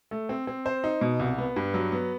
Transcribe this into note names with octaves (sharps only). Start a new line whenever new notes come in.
A3
C4
C4
C5
D#4
B2
C2
B3
G2
F#3
B3